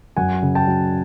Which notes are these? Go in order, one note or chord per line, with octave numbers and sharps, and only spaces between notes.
F#2 F#5 G#5
C#3
G5 A5
F#3